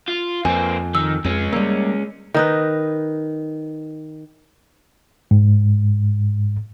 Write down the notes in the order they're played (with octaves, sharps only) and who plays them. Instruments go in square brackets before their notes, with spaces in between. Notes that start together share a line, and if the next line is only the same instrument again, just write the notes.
[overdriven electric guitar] F4
[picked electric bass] F2 [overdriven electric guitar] A#3 C4 [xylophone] G#5
[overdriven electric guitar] D#3 [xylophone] E6
[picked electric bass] F2 [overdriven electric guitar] G#3 C#4
[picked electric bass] G3 A#3 [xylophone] E6
[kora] D#3 D#4 B4
[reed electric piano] G#2